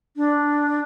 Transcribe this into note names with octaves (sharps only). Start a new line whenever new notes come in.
D4